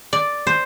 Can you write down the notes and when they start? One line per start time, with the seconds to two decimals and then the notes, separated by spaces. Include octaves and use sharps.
0.13 D5
0.47 C5